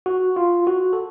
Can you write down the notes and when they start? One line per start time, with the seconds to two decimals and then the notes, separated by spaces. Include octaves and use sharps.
0.06 F#4
0.36 F4
0.67 F#4
0.93 A4